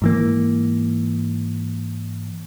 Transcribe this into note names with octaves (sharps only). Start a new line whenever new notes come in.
G#2 E3 A#3